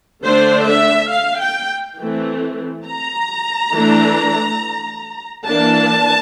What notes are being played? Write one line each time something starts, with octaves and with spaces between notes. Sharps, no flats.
D3 A3 D4 C5
E5
F5
G5
E3 A3 C4
A#5
E3 A3 D4
E3 A#3 D4 A5